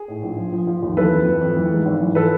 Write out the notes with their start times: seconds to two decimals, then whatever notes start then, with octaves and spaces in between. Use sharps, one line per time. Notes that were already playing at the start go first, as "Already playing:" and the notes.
Already playing: G#4
0.08 A2
0.23 A#1
0.38 F3
0.52 F3
0.67 F3
0.83 D#2
0.97 E3 A4 B4
1.12 F2
1.26 E3
1.41 F2
1.57 E3
1.71 G#2
1.86 G#1
2.01 E3
2.15 F3 A4 B4